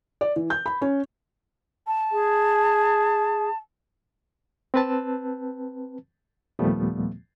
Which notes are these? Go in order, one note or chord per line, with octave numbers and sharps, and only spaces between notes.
D5
E3
G6
B5
C#4
A5
G#4
C4 B4 A5
D#2 A#2 F3 G3 A3 B3